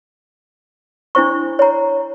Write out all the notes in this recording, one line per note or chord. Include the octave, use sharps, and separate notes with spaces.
D4 E4 C5 C#6
C#5 A#5